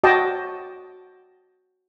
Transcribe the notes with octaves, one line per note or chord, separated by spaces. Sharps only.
F#4 D#5 G5 A5 D6